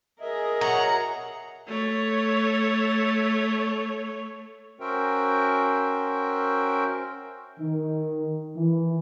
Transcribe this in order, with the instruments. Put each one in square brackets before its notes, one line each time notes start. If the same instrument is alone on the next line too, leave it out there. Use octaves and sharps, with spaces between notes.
[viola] G#4 A#4 [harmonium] D#5 E5
[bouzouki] F#3 [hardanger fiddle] F#5 A#5
[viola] A3 C#5
[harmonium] C#4 F#4 A#4 C5 E5 G5
[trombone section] D#3
E3